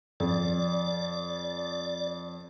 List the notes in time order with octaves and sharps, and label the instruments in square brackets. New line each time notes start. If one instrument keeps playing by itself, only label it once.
[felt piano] F2 [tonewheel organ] D5